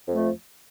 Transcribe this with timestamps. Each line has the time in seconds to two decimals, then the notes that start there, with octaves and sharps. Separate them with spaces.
0.08 F2
0.12 A3
0.16 F3